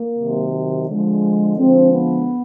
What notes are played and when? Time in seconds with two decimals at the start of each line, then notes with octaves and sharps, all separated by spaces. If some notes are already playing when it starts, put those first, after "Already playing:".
Already playing: A#3
0.17 C3 D#3 F#3
0.89 D3 F3 G#3
1.58 D3 F3 G#3 C4
1.93 B3